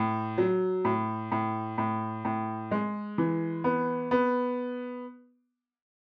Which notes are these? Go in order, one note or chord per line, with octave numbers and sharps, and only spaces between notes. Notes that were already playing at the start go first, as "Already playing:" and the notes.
Already playing: A2
F#3
A2
A2
A2
A2
G#3
E3
B3
B3